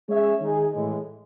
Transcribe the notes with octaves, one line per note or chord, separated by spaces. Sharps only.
G#3 C#4 G#4 C#5 E5
D#3 G#3 D#4 G#4
A2 E3 G#3